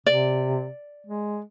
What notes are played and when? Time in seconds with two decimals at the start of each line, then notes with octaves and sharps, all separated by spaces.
0.06 C3 D5
1.07 G#3